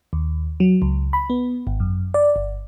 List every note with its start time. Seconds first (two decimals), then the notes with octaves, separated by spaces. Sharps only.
0.13 D#2
0.60 F#3
0.82 C#2
1.13 B5
1.30 B3
1.67 G#1
1.80 F#2
2.14 D5
2.36 G1